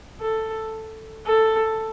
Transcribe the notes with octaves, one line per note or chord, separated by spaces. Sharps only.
A4
A4